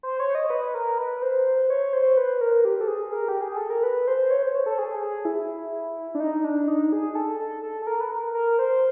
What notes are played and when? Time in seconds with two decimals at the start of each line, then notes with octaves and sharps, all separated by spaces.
0.03 C5
0.20 C#5
0.35 D#5
0.50 B4
0.74 A#4
0.98 B4
1.22 C5
1.46 C5
1.70 C#5
1.93 C5
2.17 B4
2.41 A#4
2.65 G4
2.81 A4
2.88 G#4
3.12 A#4
3.28 G4
3.41 G#4
3.56 A4
3.70 A#4
3.83 B4
4.08 C5
4.31 C#5
4.43 C5
4.55 C#5
4.66 A4
4.79 G#4
5.03 G#4
5.25 E4
6.15 D4
6.20 D#4
6.44 D4
6.68 D#4
6.92 G#4
7.15 A4
7.40 A4
7.63 A4
7.82 A4
7.87 A#4
8.01 B4
8.11 A#4
8.34 A#4
8.59 C5